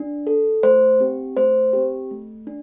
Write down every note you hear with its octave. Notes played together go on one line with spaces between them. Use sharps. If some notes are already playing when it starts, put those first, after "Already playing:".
Already playing: D4
A4
A3 C5
C4 G4
A3 C5
C4 G4
A3
D4